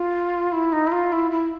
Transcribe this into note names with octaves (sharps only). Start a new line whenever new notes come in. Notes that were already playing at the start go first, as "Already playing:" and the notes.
Already playing: F4
E4
D#4
E4
F4
E4
E4